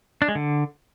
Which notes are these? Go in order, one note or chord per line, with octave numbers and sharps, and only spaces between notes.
D4
G#3
D3